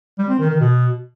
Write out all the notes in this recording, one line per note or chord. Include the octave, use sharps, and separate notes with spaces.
G3
C4
D#3
D#3
B2